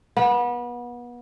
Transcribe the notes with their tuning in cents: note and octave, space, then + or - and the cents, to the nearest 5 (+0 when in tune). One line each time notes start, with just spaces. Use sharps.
B3 -30